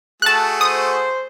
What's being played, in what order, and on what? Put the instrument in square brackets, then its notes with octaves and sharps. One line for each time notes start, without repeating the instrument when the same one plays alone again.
[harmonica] A3 F#4 G#4 [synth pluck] A5 F#6
[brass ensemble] C5 [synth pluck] D#6